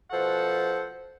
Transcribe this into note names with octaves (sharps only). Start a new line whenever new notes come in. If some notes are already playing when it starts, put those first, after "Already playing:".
B2 F3 A4 C5 F#5